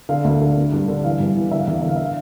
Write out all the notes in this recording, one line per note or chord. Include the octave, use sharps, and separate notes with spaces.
D3 F5
D2
D3
D3
G2
D3
E3 F5
G2
E3
D3 E5
F5
E2 E5
F5
D3 E5
F5
E5
D3
F5